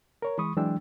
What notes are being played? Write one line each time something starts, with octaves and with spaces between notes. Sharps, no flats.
A#4 C#5 A#5
E3 G#3 B5 C#6 D#6
E3 F#3 G#3 D4 G5 E6